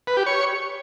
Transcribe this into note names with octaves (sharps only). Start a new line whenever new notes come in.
B4
G4
C#5